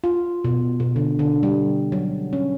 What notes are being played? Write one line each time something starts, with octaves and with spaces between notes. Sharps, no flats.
F4
B2
B2
D3
D3
G3
F#3
C#4